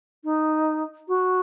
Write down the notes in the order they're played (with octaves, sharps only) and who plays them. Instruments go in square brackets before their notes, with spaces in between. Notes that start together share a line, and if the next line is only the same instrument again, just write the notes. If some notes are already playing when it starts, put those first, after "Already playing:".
[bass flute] D#4
F#4